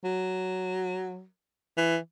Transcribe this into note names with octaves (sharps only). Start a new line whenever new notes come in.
F#3
E3